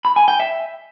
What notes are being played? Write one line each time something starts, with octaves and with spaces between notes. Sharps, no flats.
B5
G#5
G5
E5